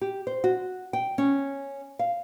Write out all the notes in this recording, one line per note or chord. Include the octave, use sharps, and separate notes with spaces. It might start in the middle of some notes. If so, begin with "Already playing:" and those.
G4
C5
F#4
G5
C#4
F5